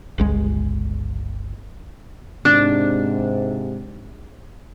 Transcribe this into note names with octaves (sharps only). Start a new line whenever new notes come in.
G1 C#2 G#3
G#2 C3 D4